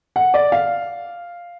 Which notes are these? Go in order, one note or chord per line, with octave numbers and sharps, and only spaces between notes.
F#5
D5
F5